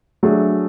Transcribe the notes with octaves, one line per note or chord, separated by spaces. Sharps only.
F#3 A3 D4 G#4